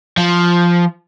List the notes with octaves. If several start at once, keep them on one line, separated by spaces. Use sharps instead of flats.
F3